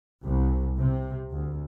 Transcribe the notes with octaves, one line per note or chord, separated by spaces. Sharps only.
C2
C3
D2